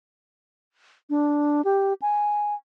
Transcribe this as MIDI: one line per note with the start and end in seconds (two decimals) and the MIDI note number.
1.10 1.62 62
1.65 1.93 67
2.02 2.54 80